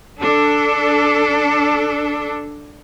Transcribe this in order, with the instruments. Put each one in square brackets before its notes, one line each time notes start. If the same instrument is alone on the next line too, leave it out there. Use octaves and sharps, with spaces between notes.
[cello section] D4 A4